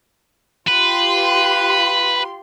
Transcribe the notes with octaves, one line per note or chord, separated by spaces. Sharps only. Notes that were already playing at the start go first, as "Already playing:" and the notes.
F4 G4 B4 C6